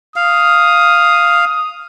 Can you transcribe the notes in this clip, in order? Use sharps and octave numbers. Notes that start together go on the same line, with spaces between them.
F5 D#6